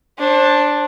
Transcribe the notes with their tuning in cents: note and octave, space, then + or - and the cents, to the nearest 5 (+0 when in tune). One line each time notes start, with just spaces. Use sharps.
D4 +0 C5 +30